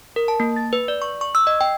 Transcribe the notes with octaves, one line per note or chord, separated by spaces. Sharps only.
A#4
A5
A#3
A6
B4
D5
C#6
C#6
E6
D#5
G5